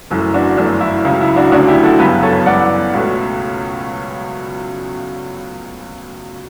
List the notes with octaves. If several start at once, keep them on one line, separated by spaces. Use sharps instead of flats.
F#1 F#2 E3 A3
D4 F#4
G1 F#2 E3 A3 D4
E4
C#2 C#3 F#3
E4
D4 F#4
E1 D2 D3 F#3 C#4 D4 F#4
E4 G4
F#4 A4
G1 F#2 C#3 F#3 B3 G4 B4
A4 C#5
F#2 E3 G3 B3 D5 F#5
C#2 B2 A3 C#4